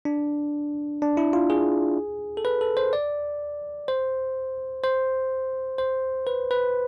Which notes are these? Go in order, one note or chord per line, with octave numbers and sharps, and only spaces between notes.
D4
D4
E4
F4
G#4
A4
B4
A4
C5
D5
C5
C5
C5
B4
B4